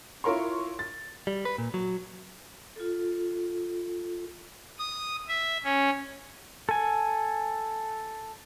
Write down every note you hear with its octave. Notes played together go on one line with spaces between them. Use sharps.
E4 F4 A#4 C#5 C6
A6
G3
B4
A#2
F#3
F4 A4
D#6
E5
C#4
A4 G#5